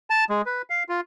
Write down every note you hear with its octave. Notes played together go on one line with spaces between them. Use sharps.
A5
G#3
B4
F5
F4